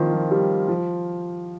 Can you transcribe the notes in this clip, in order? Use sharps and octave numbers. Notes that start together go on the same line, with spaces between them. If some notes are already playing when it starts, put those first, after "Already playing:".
Already playing: D#3 F3 A#3 C4 F4
F3
G3
F3